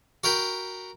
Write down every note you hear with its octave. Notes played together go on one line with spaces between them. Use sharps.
F#4 A#4 G5 B5